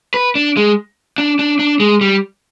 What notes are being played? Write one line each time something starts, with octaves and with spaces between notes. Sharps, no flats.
B4
D4
G#3
D4
D4
D4
G#3
G3